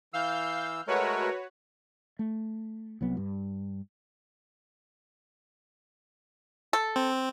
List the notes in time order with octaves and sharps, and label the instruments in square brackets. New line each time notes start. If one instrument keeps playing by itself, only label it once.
[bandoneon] E3 E6 [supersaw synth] F5 G6
[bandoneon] G#3 A3 A#4 [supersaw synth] F#4 B4 C#5
[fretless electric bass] A3
C2 F#3 B3
G2
[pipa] A4
[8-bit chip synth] C4